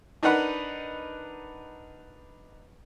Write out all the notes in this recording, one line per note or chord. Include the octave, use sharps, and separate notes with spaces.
D4 D#4 A#4 B4 F#5 B5